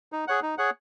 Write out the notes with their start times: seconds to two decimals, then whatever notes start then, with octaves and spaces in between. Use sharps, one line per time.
0.12 D#4
0.28 G#4 C#5 F#5
0.42 D#4
0.58 G#4 C#5 F#5